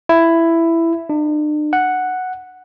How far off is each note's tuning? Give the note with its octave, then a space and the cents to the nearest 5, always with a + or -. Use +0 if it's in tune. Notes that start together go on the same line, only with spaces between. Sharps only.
E4 +10
D4 +45
F#5 +0